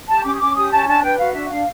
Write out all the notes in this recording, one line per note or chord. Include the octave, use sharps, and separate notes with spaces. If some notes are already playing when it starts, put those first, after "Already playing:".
G4 A5
C#4 D6
D#6
C#4 D6
G4 D#6
C#4 A5
D4 A5
B4 G5
F#4 F5
D4 E5
D4 F5